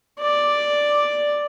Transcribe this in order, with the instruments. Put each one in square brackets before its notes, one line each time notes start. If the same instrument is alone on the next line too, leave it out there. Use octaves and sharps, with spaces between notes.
[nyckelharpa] D5